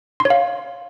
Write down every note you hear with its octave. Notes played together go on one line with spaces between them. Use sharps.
C6
C#5
F5